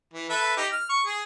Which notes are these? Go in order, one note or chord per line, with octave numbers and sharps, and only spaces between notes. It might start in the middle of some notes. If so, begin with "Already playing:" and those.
E3
A4 B4 E5
D#4 G4
F6
C#6
G#4